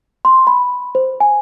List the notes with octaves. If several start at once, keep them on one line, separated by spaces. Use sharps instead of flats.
C6
B5
C5
G#5